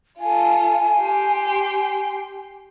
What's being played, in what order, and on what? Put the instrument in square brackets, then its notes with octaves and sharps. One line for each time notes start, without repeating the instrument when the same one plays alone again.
[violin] F4 A4 [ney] G#5
[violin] G4 C6